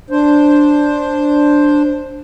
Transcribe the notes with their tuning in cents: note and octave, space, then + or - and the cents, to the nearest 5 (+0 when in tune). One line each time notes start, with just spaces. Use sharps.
D4 +0 C5 +5